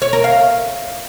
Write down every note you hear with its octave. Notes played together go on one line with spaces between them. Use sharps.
C#5
A#4
F5